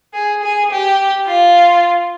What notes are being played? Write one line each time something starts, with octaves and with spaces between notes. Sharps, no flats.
G#4
G#4
G4
F4